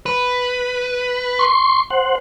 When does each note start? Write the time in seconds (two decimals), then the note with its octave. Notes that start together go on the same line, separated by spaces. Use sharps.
0.06 B4
1.39 C6 C#6
1.90 C5 F#5